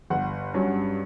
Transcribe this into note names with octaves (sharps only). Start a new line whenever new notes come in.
G1 F#5
G2 F#3 C#4